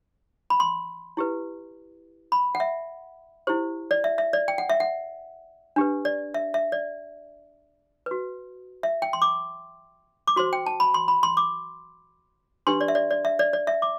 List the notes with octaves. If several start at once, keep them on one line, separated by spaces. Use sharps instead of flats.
B5
C6
E4 G4 B4
B5
F#5
E5
E4 G4 C5
D5
E5
E5
D5
G5
F#5
E5
F#5
D4 G4 B4
D5
E5
E5
D5
F#4 B4
E5
G5
C6
D6
D6
F#4 C5 C6
G5
A5
B5
C6
B5
C6
D6
D4 G4 B4 C6
D5
E5
D5
D5
E5
D5
D5
E5
D6